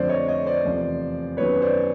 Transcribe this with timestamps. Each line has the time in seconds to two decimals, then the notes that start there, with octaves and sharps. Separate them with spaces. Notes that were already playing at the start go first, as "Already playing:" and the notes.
Already playing: F2 D3 F3 A3 C5 D5
0.09 C#5 D#5
0.28 C#5 D#5
0.46 C5 D5
0.65 E2 C3 F3 A3
1.37 F#2 D#3 F#3 B3 B4 C#5
1.62 C5 D5